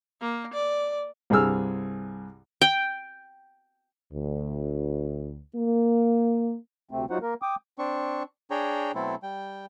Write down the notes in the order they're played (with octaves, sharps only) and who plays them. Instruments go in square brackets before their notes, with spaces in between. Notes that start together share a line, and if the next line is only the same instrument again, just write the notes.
[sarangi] A#3
D5
[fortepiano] C2 G2 G#4 E6 F6
[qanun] G5
[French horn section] D2
A#3
[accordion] D2 C3 A3 C4
F#3 D#4 F4 F#4 C5 F#5
A#3 A#4
G5 D6 D#6
[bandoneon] C4 D4 C#6
D4 G#4 C#5 G5 A#5
B2 F#3 A3 C4 E4 A4
G3 G5